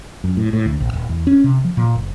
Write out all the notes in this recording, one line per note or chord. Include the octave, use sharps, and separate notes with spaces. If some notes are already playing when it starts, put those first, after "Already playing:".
F#2
A2
A2
D2
A#1
D#1
E2
C#4
C3
F3
A#2
F#1